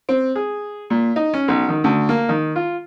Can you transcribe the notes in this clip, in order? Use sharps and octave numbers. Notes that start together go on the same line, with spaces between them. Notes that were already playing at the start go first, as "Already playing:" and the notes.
C4
G#4
A#2
D#4
C#4
B1
D#3
D2
A#3
D#3
F4